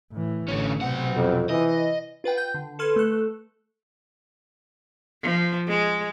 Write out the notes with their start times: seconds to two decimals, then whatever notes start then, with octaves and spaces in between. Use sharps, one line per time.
0.12 A2 E3
0.49 A1 D3 C#4
0.82 B1 C3 C4 F#5
1.16 F2
1.49 E3 D#5
2.24 F4 B4 F#5 G5
2.37 G5 G6
2.54 D3
2.79 A4 B4 C6 F6 G#6
2.96 A3 A4 F#6
5.23 F3
5.68 G#3